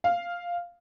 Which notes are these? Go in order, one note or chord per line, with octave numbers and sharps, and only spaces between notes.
F5